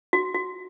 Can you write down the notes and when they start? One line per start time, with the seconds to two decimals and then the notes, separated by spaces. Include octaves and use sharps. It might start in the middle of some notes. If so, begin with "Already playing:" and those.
0.13 F#4
0.35 F#4